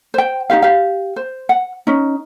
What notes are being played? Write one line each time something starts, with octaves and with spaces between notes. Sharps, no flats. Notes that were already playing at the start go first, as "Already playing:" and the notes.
C5 G5
D#4 F#4 G4 F5
G4 F5
C5
F#5
C#4 D#4